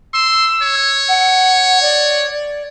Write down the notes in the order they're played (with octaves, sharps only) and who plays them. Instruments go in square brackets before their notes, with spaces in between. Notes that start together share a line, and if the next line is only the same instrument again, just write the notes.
[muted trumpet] C6 [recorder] E6
[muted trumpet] C#5
[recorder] F#5
D5